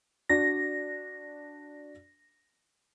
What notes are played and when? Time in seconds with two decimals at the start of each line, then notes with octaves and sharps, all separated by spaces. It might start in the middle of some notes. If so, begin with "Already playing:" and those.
0.29 D4 F#4 D5 A#6